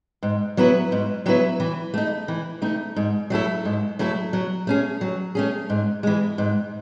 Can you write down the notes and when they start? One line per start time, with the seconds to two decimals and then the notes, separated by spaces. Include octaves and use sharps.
0.23 G#2
0.57 F#3 B3 E4 B4
0.92 G#2
1.26 F#3 B3 E4 B4
1.60 E3
1.94 A3 D#4
2.28 E3
2.62 A3 D#4
2.96 G#2
3.30 F#3 A3 E4 A4
3.65 G#2
3.99 F#3 A3 E4 A4
4.33 F#3
4.67 A3 C#4 G#4
5.01 F#3
5.35 A3 C#4 G#4
5.70 G#2
6.03 E3 G#3
6.38 G#2